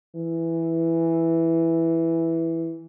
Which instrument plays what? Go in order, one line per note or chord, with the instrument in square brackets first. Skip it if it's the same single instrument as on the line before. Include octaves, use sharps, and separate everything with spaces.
[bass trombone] E3